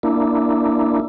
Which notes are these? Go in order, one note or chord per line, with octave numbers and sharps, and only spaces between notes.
A#3 D4 E4